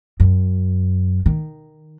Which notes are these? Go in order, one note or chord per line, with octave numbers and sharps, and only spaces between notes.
F#2
D#3